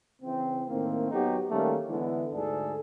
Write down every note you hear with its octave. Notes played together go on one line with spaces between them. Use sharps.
C#3 E3 C4
A2 D#3 A#3 C4
F#3 B3 D#4 F#4 G4
D#3 G3 A3 A#3 C#4
D3 E3 G#3 B3 E4
D2 G#2 D4 G#4 A4